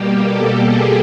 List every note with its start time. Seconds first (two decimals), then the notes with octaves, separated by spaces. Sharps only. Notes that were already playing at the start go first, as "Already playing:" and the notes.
Already playing: B2 G3 A#3 G4
0.25 A4
0.64 G#4